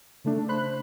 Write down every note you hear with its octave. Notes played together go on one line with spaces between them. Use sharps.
C#3 A3 D4
C5 B5 F#6